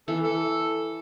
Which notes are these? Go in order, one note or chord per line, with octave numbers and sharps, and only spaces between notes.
E3 A4
A4